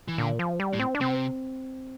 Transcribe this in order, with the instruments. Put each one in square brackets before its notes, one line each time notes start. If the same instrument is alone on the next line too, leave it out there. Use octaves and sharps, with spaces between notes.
[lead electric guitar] E3
[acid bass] A#2 [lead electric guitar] D3
[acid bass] F3
G3
[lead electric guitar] A2
[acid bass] C4
D4
[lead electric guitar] C3 [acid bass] C4